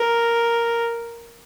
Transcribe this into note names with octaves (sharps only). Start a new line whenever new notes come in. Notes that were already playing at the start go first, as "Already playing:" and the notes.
Already playing: A#4